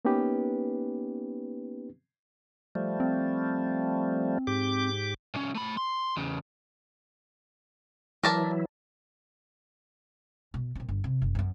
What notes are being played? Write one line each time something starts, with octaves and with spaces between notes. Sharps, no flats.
A#3 B3 C#4 D#4 G4 B4
F3 G3 A3
C4
G#2 G4 D6
C2 C#4
A3 B5
C6
E2 C#3
E3 F#3 E4 A#4 D5 A5
B2
A#2 C4
G1
C3
F#1
F#2 B3